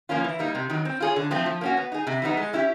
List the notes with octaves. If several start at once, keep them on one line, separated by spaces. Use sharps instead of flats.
F3 A#3 C#4 F4
E3
G3 A#3 D#4
C3
D#3 F#3
C4
F4 G#4 C#5
D3
F3 A3 C4 F4
F3
A#3 C#4 F#4
B3
D#4 G#4
C3
E3 G3 B3 D#4
G#3
C#4 E4 G4